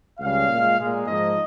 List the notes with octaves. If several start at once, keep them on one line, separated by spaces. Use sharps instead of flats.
C#2 C#3 G3 F5
A#2 G#3
A#2 G#3
G#2 F3 A#3 D#5